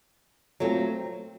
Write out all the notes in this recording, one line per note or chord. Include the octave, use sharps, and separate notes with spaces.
F#3 A3 C4 F4